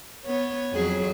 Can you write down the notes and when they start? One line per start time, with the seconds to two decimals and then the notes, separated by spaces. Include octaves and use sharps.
0.25 B3 C#5
0.73 F2 F#3 G#4